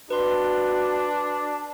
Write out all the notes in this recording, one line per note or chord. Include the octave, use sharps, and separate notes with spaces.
D4 F#4 B4 C6